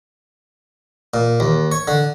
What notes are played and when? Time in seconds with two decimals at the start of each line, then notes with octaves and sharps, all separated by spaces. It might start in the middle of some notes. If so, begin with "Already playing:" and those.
1.14 A#2
1.40 D#2
1.72 C#5
1.88 D3